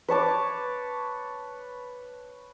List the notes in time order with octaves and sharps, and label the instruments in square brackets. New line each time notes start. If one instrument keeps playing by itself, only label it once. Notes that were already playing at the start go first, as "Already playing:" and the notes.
[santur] B4 C#5 A5 D6